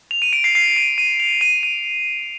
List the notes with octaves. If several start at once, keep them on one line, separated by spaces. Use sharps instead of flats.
F7
D#7
D7
C7
C7
D#7
D#7
F7
D#7
D#7